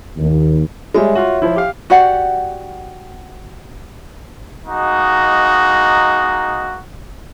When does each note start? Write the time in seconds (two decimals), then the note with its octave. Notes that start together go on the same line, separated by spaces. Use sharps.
0.18 D#2
0.94 G3 G#3 C#5 E5
1.15 F4 F#4
1.42 F3 E4
1.56 G4 F5
1.90 F#4 G4 D5 F#5
4.66 G#3 A#3 D#4 F#4